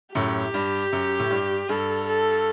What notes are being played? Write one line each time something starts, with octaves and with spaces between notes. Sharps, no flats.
F#2 A2 G4
G2
F#2
A2
G2
G2 A4
A4